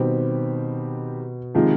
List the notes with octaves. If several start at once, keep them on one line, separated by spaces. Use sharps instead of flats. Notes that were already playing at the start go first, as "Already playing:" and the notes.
Already playing: B2 D#3 G3 C4 G4
C3 D#3 F3 G#3